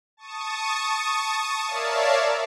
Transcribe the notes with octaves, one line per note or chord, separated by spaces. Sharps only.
A5 C#6 D#6
A#4 C#5 D5 E5 F5 A5